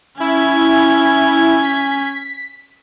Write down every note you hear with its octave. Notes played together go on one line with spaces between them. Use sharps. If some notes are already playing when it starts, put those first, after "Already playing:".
C#4 E4 G#5
B6